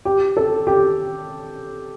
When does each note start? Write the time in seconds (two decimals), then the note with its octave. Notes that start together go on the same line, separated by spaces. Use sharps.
0.05 G4
0.37 A4
0.67 G4